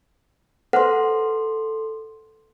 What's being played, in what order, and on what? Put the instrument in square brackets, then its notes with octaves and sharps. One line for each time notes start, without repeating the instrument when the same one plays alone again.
[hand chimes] A4 C6 [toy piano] B4 C5 F#5